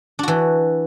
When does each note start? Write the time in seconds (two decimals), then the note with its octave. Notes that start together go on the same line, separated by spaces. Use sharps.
0.19 D4
0.23 F#4
0.28 E3